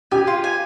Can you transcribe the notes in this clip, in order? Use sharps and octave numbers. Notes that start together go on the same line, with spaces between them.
G4 G#5
F4
G#5